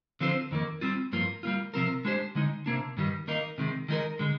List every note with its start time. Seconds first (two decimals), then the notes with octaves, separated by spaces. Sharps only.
0.20 D3 F3 C4 F4 C5
0.51 F2 D#3 A#3
0.81 G3 C4 F4
1.13 G2 F3 A#3 F4
1.43 G3 A#3 F4
1.74 C3 F3 C4 F4 A#4
2.05 G#3 D4 G4 C5
2.35 D3 G#3 D#4
2.66 C3 D#3 A#3 D4
2.97 G2 D#3 G3
3.27 D#3 A#3 D#4
3.58 C3 D#3 G#3
3.88 D#3 G#3 D#4 A#4
4.19 D3 G#3